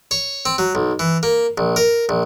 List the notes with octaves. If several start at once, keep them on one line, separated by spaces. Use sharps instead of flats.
C#5
C4
F#3
B1
E3
A#3
A#1
A#4
A#1